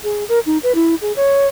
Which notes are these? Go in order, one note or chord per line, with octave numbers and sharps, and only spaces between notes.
G#4
A#4
D#4
B4
E4
G#4
C#5